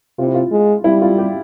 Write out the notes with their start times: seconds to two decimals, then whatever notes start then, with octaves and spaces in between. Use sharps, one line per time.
0.18 C3 F4
0.27 E4
0.34 F4
0.51 G#3
0.84 G3 E4
1.02 F4
1.18 G4